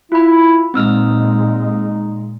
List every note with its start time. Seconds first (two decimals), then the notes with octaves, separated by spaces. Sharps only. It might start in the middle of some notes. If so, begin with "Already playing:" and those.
0.12 E4 F4 B5
0.74 A#2 G#3 C4 D#4 E6 F6